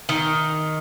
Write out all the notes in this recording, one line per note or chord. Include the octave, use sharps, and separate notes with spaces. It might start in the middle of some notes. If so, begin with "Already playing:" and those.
D#3